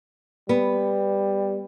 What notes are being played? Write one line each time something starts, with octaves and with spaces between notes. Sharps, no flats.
G3 B3